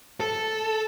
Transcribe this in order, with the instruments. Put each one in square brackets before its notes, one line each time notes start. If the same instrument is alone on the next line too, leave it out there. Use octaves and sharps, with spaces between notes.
[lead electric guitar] A4